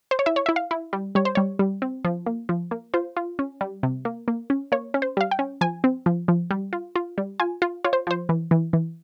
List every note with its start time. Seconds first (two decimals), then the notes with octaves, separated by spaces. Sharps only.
0.11 C5
0.19 C#5
0.26 E4 E5
0.36 C#5
0.46 E4 E5
0.56 F5
0.71 E4
0.93 G3
1.15 G3 C#5
1.25 C5
1.35 G3 C#5
1.59 G3
1.82 C4
2.05 F3
2.26 A#3
2.49 F3
2.71 A#3
2.94 F4 C5
3.17 F4
3.39 C#4
3.61 G3
3.83 C3
4.05 A#3
4.28 A#3
4.50 C#4
4.72 A#3 C#5
4.94 C#4
5.02 C5
5.17 G3 F5
5.31 G5
5.39 C#4
5.61 F3 G#5
5.84 C4
6.06 F3
6.28 F3
6.51 G3
6.73 F4
6.96 F4
7.18 G3
7.40 F4 G#5
7.62 F4
7.84 F4 C#5
7.93 C5
8.07 F3 C5
8.29 E3
8.51 E3
8.73 E3